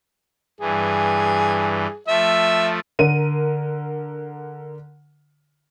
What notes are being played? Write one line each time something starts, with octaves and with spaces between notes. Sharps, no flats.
G2 E3 G#4
F3 A3 E5
D3 A#4 D#7